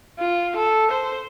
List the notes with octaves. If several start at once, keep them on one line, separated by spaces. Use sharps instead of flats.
F4
A4
C5